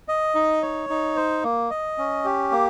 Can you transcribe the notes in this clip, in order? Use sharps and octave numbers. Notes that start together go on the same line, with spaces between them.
D#5
D#4
C#5
D#4
C5
A#3
D#5
C#4
G4
A#3